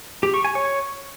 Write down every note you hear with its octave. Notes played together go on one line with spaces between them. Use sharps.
G4
C#6
G#5
C#5